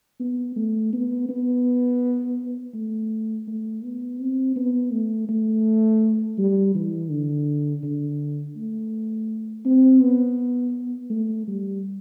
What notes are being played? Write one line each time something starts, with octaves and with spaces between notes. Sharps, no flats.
B3
A3
B3
B3
A3
A3
B3
C4
B3
A3
A3
G3
E3
D3
D3
A3
C4
B3
A3
G3